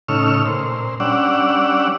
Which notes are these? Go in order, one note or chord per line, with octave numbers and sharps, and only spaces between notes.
A2 C#3 D#4 C#6 E6 F6
A#2 C5
G3 C#4 D4 D5 F#5 E6